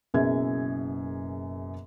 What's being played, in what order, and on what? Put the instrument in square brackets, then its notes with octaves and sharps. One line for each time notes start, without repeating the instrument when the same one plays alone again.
[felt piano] F#1 F#2 B2 G#4 E5 G#6